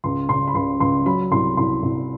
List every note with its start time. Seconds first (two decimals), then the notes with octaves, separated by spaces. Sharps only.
0.04 C#2 C6
0.29 C#3 C6
0.48 B5
0.55 C#2 C6
0.80 C#2 C6
1.06 F#3 B5
1.31 C2 C6
1.57 C2 C6
1.83 C2